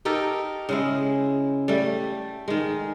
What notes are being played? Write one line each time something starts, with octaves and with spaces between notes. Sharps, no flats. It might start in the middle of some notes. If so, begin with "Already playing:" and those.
D#4 G4 A4 A#4
C#3 G#3 E4
G3 A3
D#3 G#3